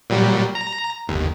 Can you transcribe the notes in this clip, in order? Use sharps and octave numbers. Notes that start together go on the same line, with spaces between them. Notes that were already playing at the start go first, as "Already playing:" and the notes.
A#2 F#3 G3
A#5
G1 D#2